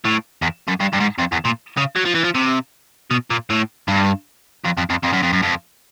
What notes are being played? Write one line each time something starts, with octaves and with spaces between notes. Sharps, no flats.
A2
E2
F#2
G2
G2
G#2
F2
E2
A#2
C#3
F#3
F3
E3
F3
C3
B2
A#2
A2
G2
F2
F2
F2
F2
F#2
F2
F#2
F2